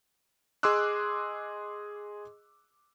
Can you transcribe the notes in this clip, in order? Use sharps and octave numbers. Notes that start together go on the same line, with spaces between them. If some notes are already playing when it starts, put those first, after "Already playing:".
G#4 D#5 C6 D6 E6 F#6